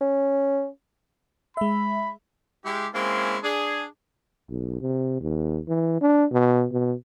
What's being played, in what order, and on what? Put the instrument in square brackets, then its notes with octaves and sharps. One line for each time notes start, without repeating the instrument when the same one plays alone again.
[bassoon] C#4
[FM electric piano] G#3 E5 [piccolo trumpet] B5
[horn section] G#3 E4 G4
G#3 A#3 C4 C#4 E4
D4 G#4
[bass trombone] B1
C3
D#2
E3
D4
B2
B2